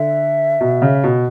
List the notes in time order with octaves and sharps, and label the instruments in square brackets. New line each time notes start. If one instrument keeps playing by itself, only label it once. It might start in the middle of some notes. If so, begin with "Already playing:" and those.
Already playing: [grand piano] D3 [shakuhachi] E5
[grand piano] B2
C#3
B2